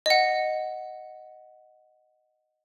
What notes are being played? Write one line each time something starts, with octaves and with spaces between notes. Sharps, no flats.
D#5 F#5